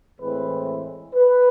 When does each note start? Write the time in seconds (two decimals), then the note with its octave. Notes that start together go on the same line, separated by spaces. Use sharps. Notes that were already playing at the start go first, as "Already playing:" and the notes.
0.21 A2 E3 G#3 C4 B4
1.15 B4